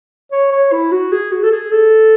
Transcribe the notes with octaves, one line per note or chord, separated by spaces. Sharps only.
C#5
C#5
E4
F#4
G#4
F#4
A4
G#4
A4